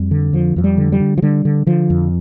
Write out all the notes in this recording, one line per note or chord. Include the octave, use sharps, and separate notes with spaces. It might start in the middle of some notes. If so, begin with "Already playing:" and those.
Already playing: F2 G3
D3
F2 F3
F2 F3
G3
D3
G3
D3
F3
D3 G3
D3
D3 F3
F2